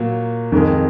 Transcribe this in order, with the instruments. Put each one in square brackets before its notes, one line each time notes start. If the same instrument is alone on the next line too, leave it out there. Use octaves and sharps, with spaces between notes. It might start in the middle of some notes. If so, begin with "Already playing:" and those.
Already playing: [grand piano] A#2 F#3
F2 D#3 G#3